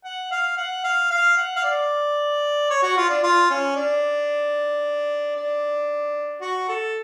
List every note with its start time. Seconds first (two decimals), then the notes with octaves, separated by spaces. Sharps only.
0.04 F#5
0.31 F5
0.57 F#5
0.84 F5
1.10 F5
1.37 F#5
1.56 F5
1.63 D5
2.70 C#5
2.82 F#4
2.97 F4
3.09 D4
3.23 F4
3.50 C#4
3.76 D4
5.35 D4
6.41 F#4
6.68 A4